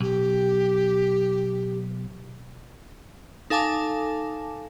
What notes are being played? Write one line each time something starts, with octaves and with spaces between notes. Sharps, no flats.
B1 G4
D#4 A4 F5 G#5 A5 D6